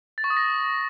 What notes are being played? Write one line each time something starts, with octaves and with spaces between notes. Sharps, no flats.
A6
C#6
D#6
A#6